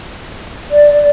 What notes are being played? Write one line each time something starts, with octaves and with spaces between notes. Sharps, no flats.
D5